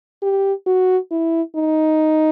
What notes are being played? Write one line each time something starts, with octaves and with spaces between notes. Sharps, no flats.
G4
F#4
E4
D#4